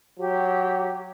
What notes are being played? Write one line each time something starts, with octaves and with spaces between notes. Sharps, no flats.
F#3 G4